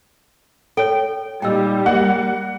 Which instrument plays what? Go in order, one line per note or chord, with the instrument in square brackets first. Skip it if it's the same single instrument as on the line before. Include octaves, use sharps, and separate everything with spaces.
[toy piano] A4 C#5 [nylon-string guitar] G5
[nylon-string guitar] A#2 D#4 [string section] G3 [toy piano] G5 E6
[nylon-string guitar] A#3 [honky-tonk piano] F#5